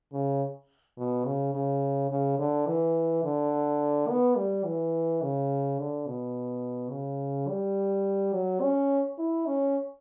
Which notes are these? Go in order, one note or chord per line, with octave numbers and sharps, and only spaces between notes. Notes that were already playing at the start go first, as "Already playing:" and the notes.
C#3
B2
C#3
C#3
C#3
D3
E3
D3
B3
G3
E3
C#3
D3
B2
C#3
G3
F#3
C#4
E4
C#4